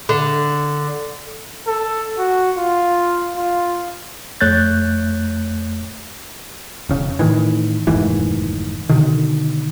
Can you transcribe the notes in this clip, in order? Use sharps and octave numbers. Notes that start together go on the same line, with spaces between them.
D3
A4
F#4
F4
F4
F2 A3 C#5 F#6 G6 A6
E1 C#3
A2 D#3 E3
F1 D#2 G#2 E3
B2 D3 D#3